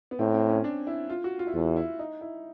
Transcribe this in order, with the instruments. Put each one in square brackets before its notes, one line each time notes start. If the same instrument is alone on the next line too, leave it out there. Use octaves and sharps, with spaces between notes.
[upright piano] B3
[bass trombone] A2 [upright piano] C4
[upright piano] C4
C#4
D4
E4
F4
F#4
F4
E4
[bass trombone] E2 [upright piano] F4
[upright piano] E4
D#4
E4